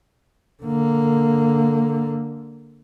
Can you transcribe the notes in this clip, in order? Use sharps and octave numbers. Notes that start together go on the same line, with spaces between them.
D3 A#3